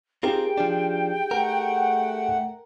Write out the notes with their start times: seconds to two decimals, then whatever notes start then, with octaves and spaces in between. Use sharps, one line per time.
0.23 C4 D#4 F4 G4 G#4 A#4 G5
0.58 F3 D4
1.31 A3 A#4 F#5